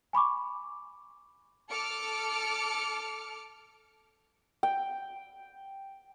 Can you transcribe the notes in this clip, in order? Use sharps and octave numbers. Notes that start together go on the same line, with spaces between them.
G#5 B5 C#6 D6
A4 D6 F6 C#7
G5